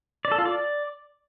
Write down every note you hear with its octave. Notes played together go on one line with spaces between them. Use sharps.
D5
A4
F4
D5